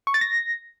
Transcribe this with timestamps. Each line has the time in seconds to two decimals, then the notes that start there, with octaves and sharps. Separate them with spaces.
0.07 C#6
0.14 A6
0.21 A#6